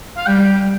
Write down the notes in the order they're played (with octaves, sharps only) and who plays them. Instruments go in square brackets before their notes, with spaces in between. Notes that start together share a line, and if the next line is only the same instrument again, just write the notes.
[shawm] F5
[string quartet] G3 [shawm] G5